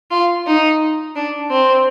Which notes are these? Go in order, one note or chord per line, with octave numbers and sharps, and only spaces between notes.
F4
D#4
D4
C4